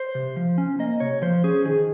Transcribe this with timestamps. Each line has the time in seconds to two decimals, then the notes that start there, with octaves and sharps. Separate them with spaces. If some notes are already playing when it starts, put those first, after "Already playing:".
Already playing: C5
0.15 C3
0.36 F3
0.58 C#4
0.79 A#3 D#5
1.00 C3 C#5
1.22 F3 C5
1.44 C#4 G#4
1.65 D#3 G#4